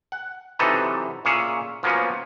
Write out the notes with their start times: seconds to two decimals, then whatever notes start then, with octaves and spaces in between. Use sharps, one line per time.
0.12 F#5
0.59 C3 E3 F#3 D#4 A4 B4
1.25 A#2 C#4 G#4 C#5 E5
1.83 F3 F#3 A#3 B3 C#4